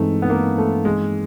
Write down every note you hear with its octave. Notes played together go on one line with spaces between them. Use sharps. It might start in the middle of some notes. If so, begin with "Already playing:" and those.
Already playing: G2 E3 G#3 A3 C4 D#4
B3
A#3
A3
G#3